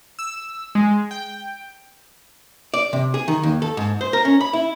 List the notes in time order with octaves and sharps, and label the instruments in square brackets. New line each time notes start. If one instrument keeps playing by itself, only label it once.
[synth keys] E6
G#3
G5
[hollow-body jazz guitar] D5
C3
G#4
D#3
D#2
A4
G#2
C5
A#4
C#4
B5
E4